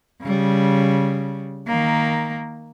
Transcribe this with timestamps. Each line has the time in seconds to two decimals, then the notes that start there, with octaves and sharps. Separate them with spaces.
0.22 C#3 G3
1.67 D#3 A#3